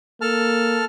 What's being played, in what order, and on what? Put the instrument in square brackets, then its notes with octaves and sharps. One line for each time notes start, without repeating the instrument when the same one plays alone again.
[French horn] A#3 [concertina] A4 A5 F6